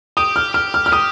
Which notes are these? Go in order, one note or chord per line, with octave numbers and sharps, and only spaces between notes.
G4 D#6
F6
G4 F6
F6
F6
G4 D#6